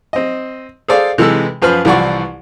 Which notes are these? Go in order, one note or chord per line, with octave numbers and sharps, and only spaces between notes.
C4 D#5
G#4 A4 C5 D5 F5
C3 E3 G#3 A4 E6
F#2 F3 B4 C5 F6
C2 E3 F3 D5 F#5 C#6